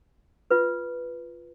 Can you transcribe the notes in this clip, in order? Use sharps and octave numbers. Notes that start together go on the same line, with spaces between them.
F4 B4